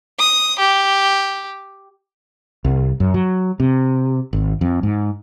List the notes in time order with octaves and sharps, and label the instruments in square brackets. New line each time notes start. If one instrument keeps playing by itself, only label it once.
[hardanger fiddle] D#6
G4
[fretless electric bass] C2
F#2
F#3
C3
G#1
F2
G#2